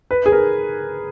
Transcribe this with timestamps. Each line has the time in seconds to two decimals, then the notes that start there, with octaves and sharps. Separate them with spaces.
0.11 B4
0.26 G#4
0.32 A#4